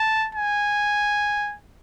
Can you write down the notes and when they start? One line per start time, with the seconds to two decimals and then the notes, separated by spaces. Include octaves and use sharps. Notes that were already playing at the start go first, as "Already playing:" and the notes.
Already playing: A5
0.35 G#5